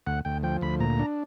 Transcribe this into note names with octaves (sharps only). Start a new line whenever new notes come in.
D2 F#5
D2 G5
F3 G5
D2 B5
A#2 A#5
D4